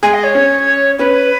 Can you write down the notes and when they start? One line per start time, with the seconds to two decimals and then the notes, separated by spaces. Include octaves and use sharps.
0.03 G#3 G#4 G#5
0.14 D#5
0.24 C#5
0.35 C#4
0.99 C#4 B4